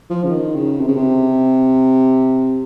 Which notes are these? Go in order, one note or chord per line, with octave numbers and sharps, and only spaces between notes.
F3
C#3
D#3
C#3
C3
C#3
C3